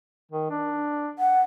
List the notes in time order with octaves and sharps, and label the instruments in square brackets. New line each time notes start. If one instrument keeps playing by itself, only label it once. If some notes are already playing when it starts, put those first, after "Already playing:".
[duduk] D#3
D4
[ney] F#5